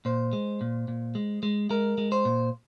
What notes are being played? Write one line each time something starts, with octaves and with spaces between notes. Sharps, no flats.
A#2 C5
G#3
A#2
A#2
G#3
G#3
G#3 A#4
G#3
C5
A#2